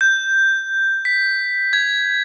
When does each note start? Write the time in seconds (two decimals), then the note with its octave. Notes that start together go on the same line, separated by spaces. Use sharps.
0.01 G6
1.05 B6
1.73 G#6